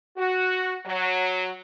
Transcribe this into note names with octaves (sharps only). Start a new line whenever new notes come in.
F#4
F#3